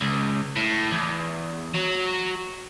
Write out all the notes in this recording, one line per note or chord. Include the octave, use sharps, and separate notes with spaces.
C#2
A2
E2
F#3